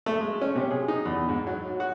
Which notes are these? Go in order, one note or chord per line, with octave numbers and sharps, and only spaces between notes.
A3
G#3
C#4
C3
G#4
D#4
E2
G#2
F#3
F#4